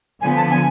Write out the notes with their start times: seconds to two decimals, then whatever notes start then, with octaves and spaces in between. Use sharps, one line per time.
0.21 D3 F3 B3 G#5
0.36 A5
0.51 G#5